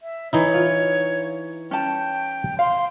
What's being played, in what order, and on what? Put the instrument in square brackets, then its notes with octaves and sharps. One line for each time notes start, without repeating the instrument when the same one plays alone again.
[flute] E5
[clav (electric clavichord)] E3 D#4 E4 [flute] C#5
[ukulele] F4
[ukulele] C#4 A5 [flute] G5
[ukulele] F5 [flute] C6